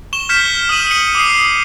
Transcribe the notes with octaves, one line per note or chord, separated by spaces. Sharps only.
C#6 E7 G7
F6 G6 B6 C#7 E7 G7
D#6 F6 D#7 F#7
C#7
D6 D#6 C7
C7